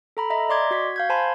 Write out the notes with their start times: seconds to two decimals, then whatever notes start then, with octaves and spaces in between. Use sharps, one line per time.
0.17 A4 A#5 B5
0.30 D#5 E5 A#5
0.49 D5 D#5 C6 D6 G#6
0.71 F#4 G#6 B6
0.96 F5 G6 G#6
1.09 C5 G#5 A5 B5 C6